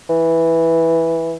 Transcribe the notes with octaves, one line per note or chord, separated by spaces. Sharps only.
E3